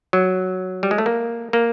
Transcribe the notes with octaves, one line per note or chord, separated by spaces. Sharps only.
F#3
G3
G#3
A3
A#3
A#3